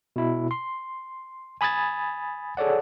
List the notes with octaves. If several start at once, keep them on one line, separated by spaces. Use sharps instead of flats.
B2 E4
C6
G#5 B5 D#6 G#6 A6
G#4 A4 C#5 D5 F#5